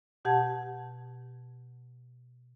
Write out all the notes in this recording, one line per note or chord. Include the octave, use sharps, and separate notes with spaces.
B2 G4 F#5 A5 G#6